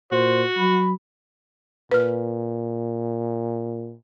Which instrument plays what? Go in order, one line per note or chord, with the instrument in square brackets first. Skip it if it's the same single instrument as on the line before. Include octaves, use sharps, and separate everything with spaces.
[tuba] A#2 [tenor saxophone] F#4 [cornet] C5
[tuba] F#3 [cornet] B5
[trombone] A#2 [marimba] B4 F6